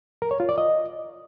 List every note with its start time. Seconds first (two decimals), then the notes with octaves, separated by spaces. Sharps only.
0.22 A#4
0.31 C#5
0.40 F4
0.49 D5
0.58 D#5